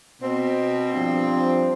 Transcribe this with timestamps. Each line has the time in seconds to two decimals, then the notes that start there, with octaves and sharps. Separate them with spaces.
0.21 B2 C4
0.93 G2 F3